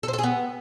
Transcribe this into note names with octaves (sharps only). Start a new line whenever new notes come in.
A4
C5
A4
G#4
B3